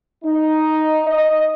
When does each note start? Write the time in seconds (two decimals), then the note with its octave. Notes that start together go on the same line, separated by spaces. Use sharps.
0.24 D#4
1.06 D#5